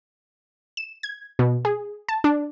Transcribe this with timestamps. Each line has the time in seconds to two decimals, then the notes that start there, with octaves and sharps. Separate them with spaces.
0.77 E7
1.03 G#6
1.39 B2
1.65 G#4
2.09 A5
2.24 D4